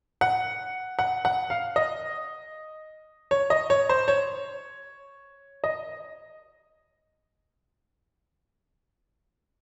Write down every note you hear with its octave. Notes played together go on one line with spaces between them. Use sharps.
F#5
F#5
F#5
F5
D#5
C#5
D#5
C#5
C5
C#5
D#5